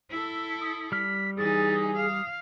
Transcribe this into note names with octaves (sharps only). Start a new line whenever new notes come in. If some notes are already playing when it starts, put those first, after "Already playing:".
E4 A4
D#6
G3 F6 B6
E3 D#4 G#4 A6
F5 D#6